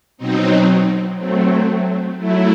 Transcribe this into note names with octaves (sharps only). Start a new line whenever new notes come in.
B2 F#3 C4 D#4
F#3 A3 C4
F#3 A3 E4